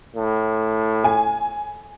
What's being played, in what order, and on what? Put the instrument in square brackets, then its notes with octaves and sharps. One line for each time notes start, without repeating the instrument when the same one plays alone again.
[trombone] A2
[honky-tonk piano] G#5